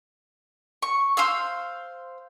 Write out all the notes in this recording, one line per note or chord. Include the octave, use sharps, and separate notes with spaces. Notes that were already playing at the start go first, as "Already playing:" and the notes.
C#6
C5 F5 E6